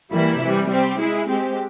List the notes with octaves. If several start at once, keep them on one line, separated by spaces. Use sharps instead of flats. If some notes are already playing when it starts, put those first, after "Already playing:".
E3 G3 A#3 E4
C3 E3 G3
G3 C4 G4
G#3 E4 G#4
G#3 C4 G4